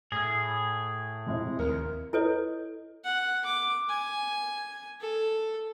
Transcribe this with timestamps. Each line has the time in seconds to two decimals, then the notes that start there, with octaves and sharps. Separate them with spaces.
0.12 A2 G#4 E6 G#6 A#6
1.27 F1 F2 G#3 E4
1.59 D#2 A#4 C#7
2.13 E4 A4 B4 C#5 D#5
3.04 F#5
3.45 D6
3.89 G#5
5.01 A4